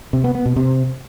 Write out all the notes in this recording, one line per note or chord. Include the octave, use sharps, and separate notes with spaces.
C3
B3
B3
B2
C3